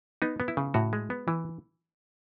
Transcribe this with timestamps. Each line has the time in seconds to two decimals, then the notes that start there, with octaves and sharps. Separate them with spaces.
0.22 B3 D#4
0.40 B3
0.48 E4
0.57 C#3
0.74 A2 F#4
0.93 G#3
1.10 B3
1.28 E3